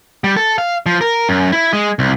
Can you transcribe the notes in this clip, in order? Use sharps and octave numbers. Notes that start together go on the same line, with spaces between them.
G3
A4
F5
F3
A#4
F#2
E4
G#3
C2